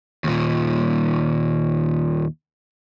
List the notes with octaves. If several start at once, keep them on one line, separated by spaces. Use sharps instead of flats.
D#2 A#2